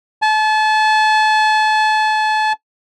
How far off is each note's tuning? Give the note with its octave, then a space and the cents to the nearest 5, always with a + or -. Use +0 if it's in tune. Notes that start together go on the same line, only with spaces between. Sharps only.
A5 -35